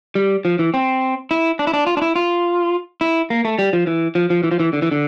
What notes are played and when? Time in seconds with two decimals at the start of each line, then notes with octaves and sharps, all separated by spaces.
0.15 G3
0.45 F3
0.59 E3
0.74 C4
1.31 E4
1.59 D4
1.67 E4
1.74 D4
1.87 F4
1.97 D4
2.02 E4
2.16 F4
3.01 E4
3.30 A#3
3.45 A3
3.59 G3
3.73 F3
3.87 E3
4.15 F3
4.30 F3
4.44 E3
4.51 F3
4.60 E3
4.73 D3
4.82 E3
4.91 D3